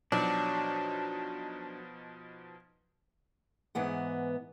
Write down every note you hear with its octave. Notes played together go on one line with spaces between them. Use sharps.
B2 F3 F#3 D4 D#4
G#2 E3 B3 F#5